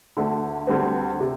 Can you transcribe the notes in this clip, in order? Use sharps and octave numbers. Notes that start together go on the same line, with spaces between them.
D2 D3 A3
D2 D3 G3 C4
C3